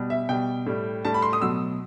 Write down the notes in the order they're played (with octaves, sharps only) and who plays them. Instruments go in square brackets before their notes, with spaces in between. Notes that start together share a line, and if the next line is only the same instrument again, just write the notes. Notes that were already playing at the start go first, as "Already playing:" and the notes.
Already playing: [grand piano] B2 G3
E5
B2 G3 G5
A2 G3
A2 G3 A5
B5
C6
D#6
B2 F#3 A3 E6